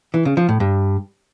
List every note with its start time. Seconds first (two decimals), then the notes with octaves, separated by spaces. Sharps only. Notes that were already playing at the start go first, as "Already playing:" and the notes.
0.14 E3
0.25 C#3
0.37 F3
0.49 A2
0.60 G2